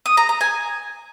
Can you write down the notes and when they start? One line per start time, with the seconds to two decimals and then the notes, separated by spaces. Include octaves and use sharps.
0.06 D#6
0.17 A#5
0.29 A#5
0.41 G#5